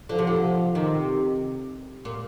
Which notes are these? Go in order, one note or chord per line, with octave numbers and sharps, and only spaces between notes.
D3 F3
C3
D3
F3
C3 D#3
A#2